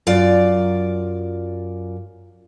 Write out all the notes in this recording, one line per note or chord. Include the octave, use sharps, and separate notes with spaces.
F#2 F4 D5